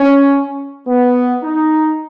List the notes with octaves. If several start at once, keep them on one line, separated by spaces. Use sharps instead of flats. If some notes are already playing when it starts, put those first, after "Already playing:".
Already playing: C#4
B3
D#4